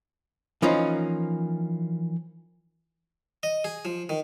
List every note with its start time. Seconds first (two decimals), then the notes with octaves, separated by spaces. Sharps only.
0.62 E3 F3 A#3 C#4 D#4
3.43 D#5
3.64 G#4
3.85 F3
4.09 D#3